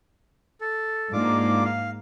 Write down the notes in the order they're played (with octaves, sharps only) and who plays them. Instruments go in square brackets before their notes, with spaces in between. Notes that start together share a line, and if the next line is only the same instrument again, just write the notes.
[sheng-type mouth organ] A4
[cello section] G#2 A#3 [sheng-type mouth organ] D4 F4 D6
[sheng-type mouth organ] F5